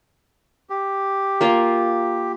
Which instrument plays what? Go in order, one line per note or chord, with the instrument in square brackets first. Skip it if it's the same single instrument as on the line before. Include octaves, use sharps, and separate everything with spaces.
[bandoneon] G4
[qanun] A#3 F4